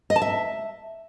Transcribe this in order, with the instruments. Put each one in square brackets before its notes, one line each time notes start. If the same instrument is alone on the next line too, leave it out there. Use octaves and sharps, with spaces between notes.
[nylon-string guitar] D#5
A5
E5